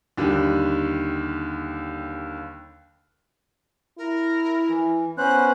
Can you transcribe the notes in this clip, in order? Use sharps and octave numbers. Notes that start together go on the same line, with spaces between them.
D#2 D3 G3
E4 A#4
E3
B3 C#4 C5 F#6